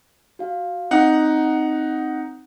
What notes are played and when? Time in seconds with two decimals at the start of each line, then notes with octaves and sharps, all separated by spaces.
0.39 F#4 F5
0.91 C4 D#4 F#5